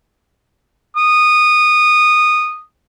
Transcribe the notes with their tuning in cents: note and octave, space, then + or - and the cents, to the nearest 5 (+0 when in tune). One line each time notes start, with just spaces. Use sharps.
D#6 -15